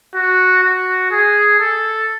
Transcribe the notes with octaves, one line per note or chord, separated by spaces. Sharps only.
F#4
F#4
G#4
A4